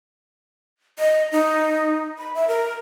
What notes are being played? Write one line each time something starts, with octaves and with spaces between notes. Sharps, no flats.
D#5
D#4
B5
E5
A#4